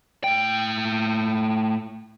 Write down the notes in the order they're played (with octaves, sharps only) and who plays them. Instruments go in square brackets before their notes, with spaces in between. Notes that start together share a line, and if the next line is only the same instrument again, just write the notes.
[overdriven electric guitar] A2 G5